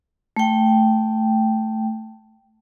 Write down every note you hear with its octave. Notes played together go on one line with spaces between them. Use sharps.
A3 G5